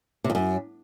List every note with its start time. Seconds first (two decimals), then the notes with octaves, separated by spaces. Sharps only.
0.24 C3
0.30 F2
0.35 F#2